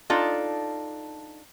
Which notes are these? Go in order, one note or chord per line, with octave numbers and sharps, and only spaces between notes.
D4 D#4 F4 A4